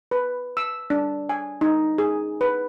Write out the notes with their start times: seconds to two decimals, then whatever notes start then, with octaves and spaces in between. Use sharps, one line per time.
0.11 B4
0.57 E6
0.90 D4
1.29 G#5
1.61 D#4
1.98 G#4
2.41 B4